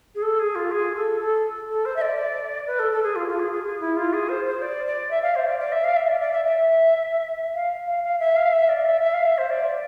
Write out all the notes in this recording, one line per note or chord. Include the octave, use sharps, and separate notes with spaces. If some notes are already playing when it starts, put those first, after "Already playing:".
G#4
A4
G#4
F4
G#4
A4
A4
A4
C5
E5
D5
B4
A4
A4
G#4
F4
F4
G#4
G#4
G#4
E4
F4
G#4
C5
C5
D5
D5
E5
F5
C5
D5
D5
E5
F5
E5
D5
D5
E5
E5
F5
F5
F5
E5
F5
E5
D5
E5
E5
F5
E5
C5
D5